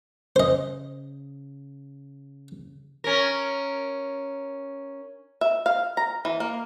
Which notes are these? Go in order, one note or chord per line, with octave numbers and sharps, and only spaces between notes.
C#3 C5 D#5
C#4 A#4
E5
F5
A#5
E3
A#3